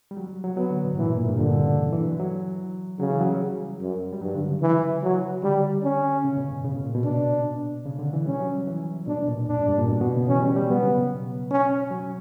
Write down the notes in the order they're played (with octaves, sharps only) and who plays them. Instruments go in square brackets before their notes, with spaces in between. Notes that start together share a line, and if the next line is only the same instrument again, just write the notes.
[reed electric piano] G3
F#3
F#3
[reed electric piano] F#3 [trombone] B3
[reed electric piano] D3
B2
G2
[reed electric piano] A#2 [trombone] E3
[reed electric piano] G2
A#2
G2
[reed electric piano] A#2 [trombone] D3
[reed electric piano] B2
C#3
E3
E3
F#3
F#3
[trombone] C#3 [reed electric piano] F#3
[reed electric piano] E3
F#3
G3
[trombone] F#2
[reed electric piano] G3
[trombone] G2 [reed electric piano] F#3
[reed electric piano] D3
C#3
[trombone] E3
F#3
[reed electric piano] D3 [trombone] G3
[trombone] C#4
[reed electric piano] C#3
B2
G2
C#3
B2
A#2
B2
[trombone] D4
[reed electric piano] C#3
D3
E3
[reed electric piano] G3 [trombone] C#4
[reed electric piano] F#3
E3
[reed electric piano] B2 [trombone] D4
[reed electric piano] A#2
[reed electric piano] F#2 [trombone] D4
[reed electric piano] G2
G2
A#2
B2
B2
C#3
[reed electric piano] E3 [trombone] C#4
[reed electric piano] G3
G3
[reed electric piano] F#3 [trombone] B3
[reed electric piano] C#3
B2
[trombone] C#4
[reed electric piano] F#3